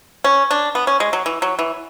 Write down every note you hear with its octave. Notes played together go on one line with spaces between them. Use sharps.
C#4
D4
B3
C#4
G#3
F#3
E3
F#3
E3